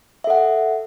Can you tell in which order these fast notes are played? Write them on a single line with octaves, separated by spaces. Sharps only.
E5 A4 F#5